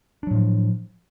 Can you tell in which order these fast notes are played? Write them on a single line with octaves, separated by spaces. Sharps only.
D4 F#3 A2 F3